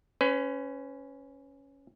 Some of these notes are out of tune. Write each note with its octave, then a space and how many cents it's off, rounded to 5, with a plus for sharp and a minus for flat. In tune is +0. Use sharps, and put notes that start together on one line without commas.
C#4 +0 B4 +35